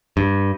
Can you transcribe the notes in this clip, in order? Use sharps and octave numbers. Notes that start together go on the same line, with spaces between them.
G2